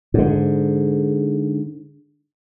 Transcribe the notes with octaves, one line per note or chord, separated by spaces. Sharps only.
G#2 D3